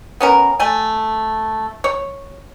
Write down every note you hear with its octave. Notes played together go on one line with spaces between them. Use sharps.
B3 C#4 A#4
A3 G#5
C#5